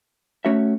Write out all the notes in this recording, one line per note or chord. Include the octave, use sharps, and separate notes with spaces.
A3 C#4 F#4 C#5 E5